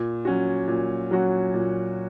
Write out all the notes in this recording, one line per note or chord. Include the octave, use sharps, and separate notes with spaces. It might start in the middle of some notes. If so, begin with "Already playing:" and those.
Already playing: A#2
F#3 C#4 F#4
A#2
F#3 C#4 F#4
A#2